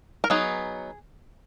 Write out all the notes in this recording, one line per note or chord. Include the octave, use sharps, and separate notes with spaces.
A#4
F#3 B3 D#4 G#4